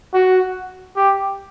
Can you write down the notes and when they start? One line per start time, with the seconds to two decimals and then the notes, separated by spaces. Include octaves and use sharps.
0.14 F#4
0.96 G4